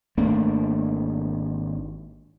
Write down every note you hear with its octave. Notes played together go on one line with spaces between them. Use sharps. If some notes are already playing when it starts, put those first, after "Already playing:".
G#1 A3 A#3 D4